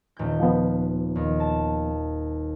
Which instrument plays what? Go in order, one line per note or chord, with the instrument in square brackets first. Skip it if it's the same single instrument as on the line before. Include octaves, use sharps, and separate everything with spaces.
[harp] D#1 G6
[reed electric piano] F3 B3
[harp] D#2
A5